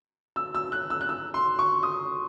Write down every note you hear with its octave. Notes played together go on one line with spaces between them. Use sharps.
E6
E6
F#6
E6
F#6
E6
C6
C#6
D#6